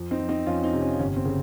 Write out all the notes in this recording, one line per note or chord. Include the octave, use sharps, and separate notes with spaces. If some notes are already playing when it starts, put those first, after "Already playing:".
Already playing: F2
C4 D#4
F3
C4 D#4
F2 C#4 F4
C4 D#4
C3
C#4
G1 C#4
C4
C#3